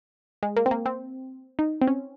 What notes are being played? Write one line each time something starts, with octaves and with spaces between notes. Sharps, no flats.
G#3
A#3
C4
A#3
C4
D#4
C4
C#4